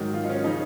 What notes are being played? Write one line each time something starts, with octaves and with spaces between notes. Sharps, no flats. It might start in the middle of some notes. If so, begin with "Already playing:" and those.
Already playing: G#2 D#3 F#3
F4
D#4
C#4
C#3 F3 D#4